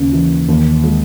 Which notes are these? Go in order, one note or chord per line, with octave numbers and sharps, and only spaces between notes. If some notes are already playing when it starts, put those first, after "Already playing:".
Already playing: D#2 C#3
E3
D#2
G#3